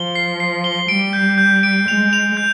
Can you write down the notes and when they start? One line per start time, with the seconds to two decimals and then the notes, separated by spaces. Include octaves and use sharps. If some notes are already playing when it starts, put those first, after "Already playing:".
Already playing: F3 G7
0.15 C7
0.40 C7
0.64 G7
0.88 G3 D7
1.13 G6
1.38 G6
1.63 D7
1.87 G#3 F7
2.13 F7
2.37 G6